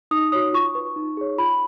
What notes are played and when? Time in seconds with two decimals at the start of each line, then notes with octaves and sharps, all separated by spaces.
0.11 D#4 D#6
0.32 F#4 C#5 D#6
0.53 F4 C#6
0.75 B4
0.96 D#4
1.17 G#4 C#5
1.38 F4 B5